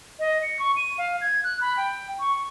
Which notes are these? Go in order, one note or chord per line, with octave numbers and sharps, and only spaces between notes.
D#5
C#7
C#6
D#7
F5
G#6
F#6
B5
G5
C#6